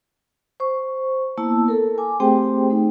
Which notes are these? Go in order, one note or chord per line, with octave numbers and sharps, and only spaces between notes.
C5 C#6
A#3 B3 E4 A5 E6
A4 A#4
G#5 D6
A3 C4 G4 G#4 C5 G5
A3 D#4